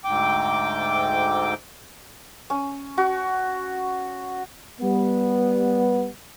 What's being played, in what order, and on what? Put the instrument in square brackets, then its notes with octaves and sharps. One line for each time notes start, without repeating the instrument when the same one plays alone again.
[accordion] D2 G#2 G5 D6
[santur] C#4
F#4
[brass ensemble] G3 B3